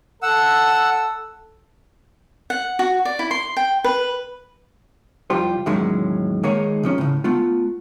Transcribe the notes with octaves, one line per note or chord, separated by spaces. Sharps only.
A4 F#5 E6
F#5
F#4
D5
E4
C6
G5
B4
C2 F2 G3 F4 G4 C5
E2 A2 D#3 F#3 G#3 C#4
D#3 G#3 A#3 D#4 G#4 C#5
C3 F3 C#4
A2 C#3
A3 B3 F4